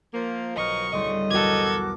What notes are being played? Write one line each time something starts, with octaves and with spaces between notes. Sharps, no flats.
F3 A#3
B1 F3 F#3 A#4 D#5 C#6
D2 A2 C#3 G3 D#5 C6
B1 E2 F#4 A4 A#4 D6 G#6